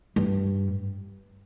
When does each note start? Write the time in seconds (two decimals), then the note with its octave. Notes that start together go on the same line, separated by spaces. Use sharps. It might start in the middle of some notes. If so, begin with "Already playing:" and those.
0.16 G2